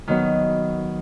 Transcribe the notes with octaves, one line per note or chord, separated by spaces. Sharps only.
D#3 F#3 B3